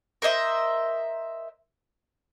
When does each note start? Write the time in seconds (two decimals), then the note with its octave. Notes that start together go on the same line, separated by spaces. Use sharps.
0.22 A#4 C5 D#5 E5